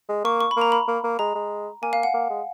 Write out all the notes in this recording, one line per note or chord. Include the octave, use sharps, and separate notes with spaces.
G#3
A#3 C#6
C#6
B5
A#3 A#5
B5
A#3
A#3
G#3 A#5
G#3
A#3 G#5
F5
F#5
A#3
G#3